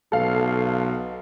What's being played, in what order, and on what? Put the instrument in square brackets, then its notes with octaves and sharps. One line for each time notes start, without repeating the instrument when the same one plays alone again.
[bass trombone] B1 [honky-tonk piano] A4 F5